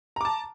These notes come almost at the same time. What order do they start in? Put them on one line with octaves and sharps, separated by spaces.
A#5 D6 A5